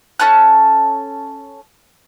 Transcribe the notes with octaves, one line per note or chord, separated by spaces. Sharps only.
C#4 A4 A5 F#6